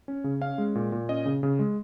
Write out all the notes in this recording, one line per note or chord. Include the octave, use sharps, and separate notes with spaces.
C#4
C#3
C#4 F5
G#3
A#2
A#2
C#4 D#5
C#3
C#3
G#3